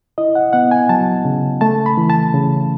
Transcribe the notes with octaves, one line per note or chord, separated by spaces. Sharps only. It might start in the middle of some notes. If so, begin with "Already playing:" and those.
E4 D#5
F#5
B3 F#5
G#5
F#3 A5
C#3
A3 A5
B5
E3
A5
C#3